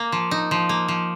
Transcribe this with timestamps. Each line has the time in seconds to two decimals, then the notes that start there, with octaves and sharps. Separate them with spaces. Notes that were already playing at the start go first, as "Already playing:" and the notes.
Already playing: A#3
0.12 F3
0.31 D#4
0.51 F3
0.69 A#3
0.88 F3